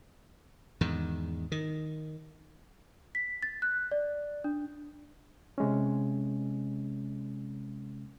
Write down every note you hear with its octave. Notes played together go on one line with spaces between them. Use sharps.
E2 G#2 D#3
D#3
B6
A6
F#6
D5
D4
C3 G#3 C#4